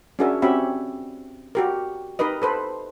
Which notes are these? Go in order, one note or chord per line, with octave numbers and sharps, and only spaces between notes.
C#4 D4 F#4 G#4 A#4 E5
C4 C#4 F#4 G4 E5 B5
F#4 G4 A#4
D#4 G4 A#4 B4 D#5
A4 B4 C5